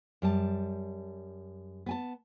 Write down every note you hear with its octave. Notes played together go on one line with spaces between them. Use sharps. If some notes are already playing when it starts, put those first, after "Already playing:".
F#2 G3 A5
B3 G#5 A5